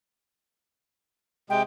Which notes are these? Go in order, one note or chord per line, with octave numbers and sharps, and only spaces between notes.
C3 G#3 G5